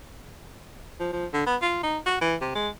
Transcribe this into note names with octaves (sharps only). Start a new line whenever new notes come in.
F3
F3
D3
B3
F4
D#4
F#4
E3
C3
G#3